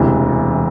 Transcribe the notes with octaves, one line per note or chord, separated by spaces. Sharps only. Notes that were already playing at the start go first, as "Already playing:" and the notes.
Already playing: E1 D2 C3 E3